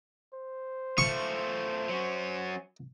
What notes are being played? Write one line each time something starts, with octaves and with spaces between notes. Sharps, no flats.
C5
A3 F4 C#6
F#3 C#4